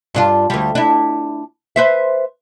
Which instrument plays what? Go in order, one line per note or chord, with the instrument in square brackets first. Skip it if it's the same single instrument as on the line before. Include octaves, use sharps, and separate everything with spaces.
[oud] G2 D4 F4
D2 G3
D4 E4
B4 C5 E5